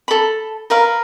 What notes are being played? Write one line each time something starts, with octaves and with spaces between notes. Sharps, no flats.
A4 B5
A#4 B4 F5